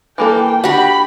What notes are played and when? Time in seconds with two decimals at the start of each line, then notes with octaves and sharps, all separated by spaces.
0.18 E3 A#3 A4 G5
0.64 D4 F#4 G4 B5